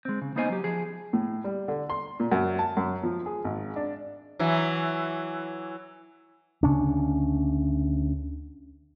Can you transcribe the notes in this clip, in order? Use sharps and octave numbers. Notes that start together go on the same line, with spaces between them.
G#3 C4
C#3
A#3 B3 D#4 C5 D#5 G#5
F#3 G4
F3 G#4
A2
G3
D3
C6
A#2
F#2
A5
F#2
F3
G#4
G#1
D4
E3 F#3
D2 C#3 C#4 D4